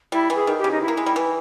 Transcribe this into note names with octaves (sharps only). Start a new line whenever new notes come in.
G3 E4
E3
G#4
D#3
G4
C#3
D#4
E4
A#3
G#3
G3
E3